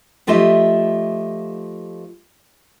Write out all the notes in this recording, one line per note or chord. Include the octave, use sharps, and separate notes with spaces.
F3 A3 F4 G4 D#5 E5